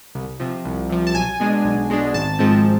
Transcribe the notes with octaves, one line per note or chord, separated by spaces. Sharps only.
C2
C3 F3
C2
C3 F3
A5
B1 G#5
B2 G#3 D4
B1
B2 G#3 D4
G#1 A5
G#2 F3 G#3 C4